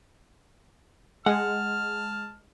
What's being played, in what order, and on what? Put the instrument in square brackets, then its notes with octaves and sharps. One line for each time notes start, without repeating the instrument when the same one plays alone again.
[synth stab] G#3 [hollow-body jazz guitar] F#5 [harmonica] A5 F6